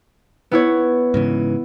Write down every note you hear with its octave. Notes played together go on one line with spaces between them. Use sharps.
B3 E4 C#5
G#2 C#3 E3